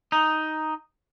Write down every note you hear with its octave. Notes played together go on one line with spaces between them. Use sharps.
D#4